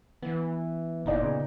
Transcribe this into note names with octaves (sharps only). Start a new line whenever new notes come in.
E3 B3
F#1 A#2 B3 D#4 D5
C#3